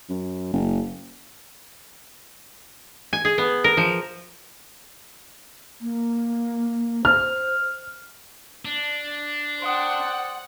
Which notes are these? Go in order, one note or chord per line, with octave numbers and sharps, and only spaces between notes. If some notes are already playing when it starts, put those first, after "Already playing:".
F#2
F#1
G#5
G#4
B3
A#4
F3
A#3
C5 F6
D4
C5 D5 F#5 G5 C6 D#6